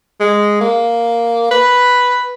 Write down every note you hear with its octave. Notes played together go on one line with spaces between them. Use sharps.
G#3
A#3
B4